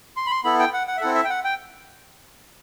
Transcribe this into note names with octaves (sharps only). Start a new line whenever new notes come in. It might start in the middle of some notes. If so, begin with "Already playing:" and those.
C6
B5
C6
B3 E4 A4 B5
G5
F#5
F#5
E5
C4 E4 A4 F#5
E5
G5
F#5
G5